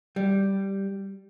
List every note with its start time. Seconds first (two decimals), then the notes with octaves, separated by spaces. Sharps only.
0.16 G3